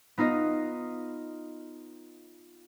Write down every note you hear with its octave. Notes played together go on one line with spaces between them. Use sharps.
B3 D#4 F4 D#5